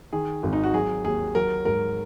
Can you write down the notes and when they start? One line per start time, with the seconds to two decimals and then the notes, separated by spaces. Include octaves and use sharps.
0.13 D#3 G#4
0.43 G#1
0.53 D#4
0.64 F#4
0.74 F#3 G#4
1.04 D#2 G#4
1.35 F#3 A#4
1.65 G#2 A#4